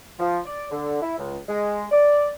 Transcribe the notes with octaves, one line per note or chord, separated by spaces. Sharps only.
F3
D5
D3
E4
C#2
G#3
D5